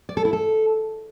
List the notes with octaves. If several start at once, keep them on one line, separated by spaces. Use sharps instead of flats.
D5
A4
E4
A4